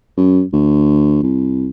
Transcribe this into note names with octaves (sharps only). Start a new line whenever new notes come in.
F#2
D2
C2